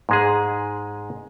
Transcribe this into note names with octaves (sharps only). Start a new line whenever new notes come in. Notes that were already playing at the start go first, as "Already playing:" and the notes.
G#2 G#3 G#4